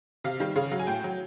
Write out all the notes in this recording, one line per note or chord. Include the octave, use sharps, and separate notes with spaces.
C3 F5
D#3 G3
C#3 F5
F#3
G#5
A2 G5
F#3